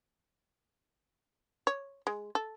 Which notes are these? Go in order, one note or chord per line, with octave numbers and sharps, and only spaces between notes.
C#5
G#3
A4